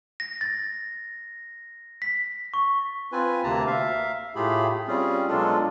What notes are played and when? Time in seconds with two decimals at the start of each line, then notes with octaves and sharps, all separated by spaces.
0.20 A#6
0.41 A6
2.02 B6
2.54 C#6
3.12 C4 F4 B4 G#5
3.44 D2 C3 A#3 A5 A#5
3.67 E5 F5
4.35 A2 A3 F4 G4 G#4 B5
4.88 G3 C4 C#4 F4 G#4
5.28 B2 F#3 G#3 D4 F4 A4